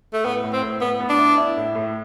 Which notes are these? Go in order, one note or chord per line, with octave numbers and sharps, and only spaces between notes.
A3
A2 B3
A2
C4
A2
A2 B3
B3
D4
E4
E4
A2
A2